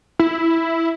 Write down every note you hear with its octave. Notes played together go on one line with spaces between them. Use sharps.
E4